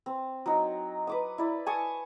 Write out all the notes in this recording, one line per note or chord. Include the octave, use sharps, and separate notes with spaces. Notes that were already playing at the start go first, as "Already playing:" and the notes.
C4
F#3 D#4
B4 D6 D#6
E4 D5
G#5 A5 C#6 D#6